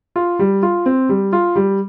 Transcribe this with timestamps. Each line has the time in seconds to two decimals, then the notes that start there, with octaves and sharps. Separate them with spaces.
0.16 F4
0.39 G3
0.63 F4
0.86 C4
1.09 G3
1.33 F4
1.56 G3